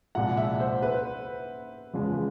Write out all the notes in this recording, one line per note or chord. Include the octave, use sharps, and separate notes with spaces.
C2 A#2 F3 G#3 F#5
E5
C5
B4
F#1 E2 C#3 F3 G#3